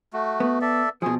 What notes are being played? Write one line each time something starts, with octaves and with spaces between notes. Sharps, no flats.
A3 F#4
B3
A4 D5 E5
B2 F3 G#4